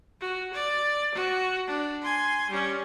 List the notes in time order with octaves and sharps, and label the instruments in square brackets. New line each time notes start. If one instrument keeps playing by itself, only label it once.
[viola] F#4
D5
F#4
D4
G#5 C6
G3 C#4